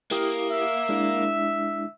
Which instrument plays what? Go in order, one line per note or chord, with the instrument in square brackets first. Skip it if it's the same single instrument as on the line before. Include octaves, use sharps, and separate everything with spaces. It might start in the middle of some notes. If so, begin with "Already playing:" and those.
[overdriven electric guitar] A#3 [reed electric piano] E4 G4 D#6
[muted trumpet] E5
[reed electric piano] G#3 D4 E4